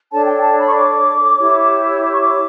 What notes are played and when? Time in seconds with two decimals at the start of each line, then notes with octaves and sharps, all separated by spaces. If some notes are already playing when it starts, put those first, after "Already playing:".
0.10 D4 A4 C#5 A5
0.26 G5
0.42 A5
0.58 B5
0.66 C#6
0.74 D6
1.37 E4 G4 C#5
2.01 D6
2.11 C#6
2.21 D6